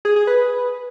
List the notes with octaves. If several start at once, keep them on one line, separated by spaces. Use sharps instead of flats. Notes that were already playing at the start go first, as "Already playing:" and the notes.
G#4
G#4
B4